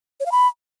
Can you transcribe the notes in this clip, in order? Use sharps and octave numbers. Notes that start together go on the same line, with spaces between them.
C#5
F5
B5